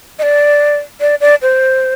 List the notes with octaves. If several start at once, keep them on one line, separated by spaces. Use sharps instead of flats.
D#5
D5
D5
D5
C5